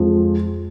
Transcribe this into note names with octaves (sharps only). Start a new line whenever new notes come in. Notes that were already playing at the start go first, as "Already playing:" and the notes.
Already playing: F2 F3 G#3